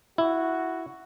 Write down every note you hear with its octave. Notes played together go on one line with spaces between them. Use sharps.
E4 F#4